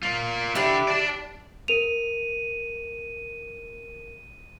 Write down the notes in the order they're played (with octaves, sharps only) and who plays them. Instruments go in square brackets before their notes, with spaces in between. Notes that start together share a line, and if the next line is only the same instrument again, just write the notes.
[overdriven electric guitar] A#3 F4
[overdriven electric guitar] D3 D4 [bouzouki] E4 G4
[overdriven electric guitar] D5 A5
[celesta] A#4 F7 [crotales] D#7